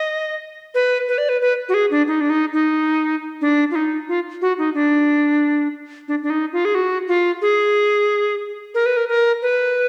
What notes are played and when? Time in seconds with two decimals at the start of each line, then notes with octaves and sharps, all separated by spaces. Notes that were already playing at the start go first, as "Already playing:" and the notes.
Already playing: D#5
0.75 B4
1.08 B4
1.18 D5
1.29 B4
1.41 B4
1.69 F#4
1.74 G#4
1.91 D4
2.08 D#4
2.21 D4
2.30 D#4
2.53 D#4
3.41 D4
3.71 F4
3.75 D#4
4.08 F4
4.42 F#4
4.58 D#4
4.74 D4
6.08 D4
6.23 D4
6.30 D#4
6.53 F4
6.65 G#4
6.75 F#4
7.08 F4
7.42 G#4
8.74 A#4
8.86 B4
8.97 A#4
9.09 A#4
9.42 B4